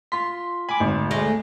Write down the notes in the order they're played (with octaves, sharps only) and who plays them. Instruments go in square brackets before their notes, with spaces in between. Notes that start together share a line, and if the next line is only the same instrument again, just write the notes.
[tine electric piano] F4 B6 [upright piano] C6
[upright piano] G#5 [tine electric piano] B5 D6
[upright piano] G#1 [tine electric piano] D2
[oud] G#3 A3